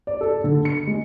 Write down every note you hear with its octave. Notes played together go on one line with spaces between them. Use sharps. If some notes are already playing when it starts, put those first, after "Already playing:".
D5
A4
D3
C#7
G#3